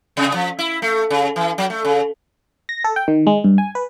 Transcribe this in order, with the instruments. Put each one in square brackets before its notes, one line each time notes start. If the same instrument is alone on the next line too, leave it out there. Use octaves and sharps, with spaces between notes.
[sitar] C3
F3
E4
A3
C#3
E3
F#3
A3
C#3
[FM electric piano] A#6
A4
G5
D#3
G#3
G2
G#5
B4